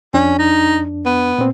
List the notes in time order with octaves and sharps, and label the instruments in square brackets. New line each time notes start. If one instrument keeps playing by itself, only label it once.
[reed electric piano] F2 D4 [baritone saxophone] C#4
[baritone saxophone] D#4
B3
[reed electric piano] A#2 C4